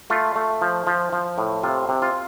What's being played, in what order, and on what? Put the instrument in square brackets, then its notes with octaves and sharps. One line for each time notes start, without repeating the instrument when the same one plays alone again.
[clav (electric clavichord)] A3 F4
A3
F3
F3
F3
A2
C3 F4
C3
F4